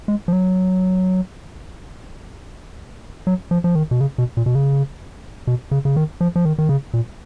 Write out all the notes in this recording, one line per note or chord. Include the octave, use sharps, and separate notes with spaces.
G#3
F3
F#3
F#3
F3
F3
D#3
B2
C#3
B2
A#2
B2
C#3
B2
C#3
C#3
D#3
F3
F3
D#3
D#3
C#3
A#2